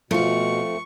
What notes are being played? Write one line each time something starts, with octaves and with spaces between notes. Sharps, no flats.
B2 F3 A3 C4 F4 C#6